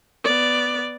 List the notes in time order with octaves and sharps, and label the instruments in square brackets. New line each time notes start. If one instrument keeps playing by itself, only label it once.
[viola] B3 D5